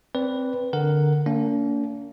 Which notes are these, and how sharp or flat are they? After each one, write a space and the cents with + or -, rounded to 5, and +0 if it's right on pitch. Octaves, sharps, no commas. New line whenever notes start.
C4 +0 B4 +0 D5 -30
D3 +0 A#4 +0 F#5 +0
A#3 -35 D4 -45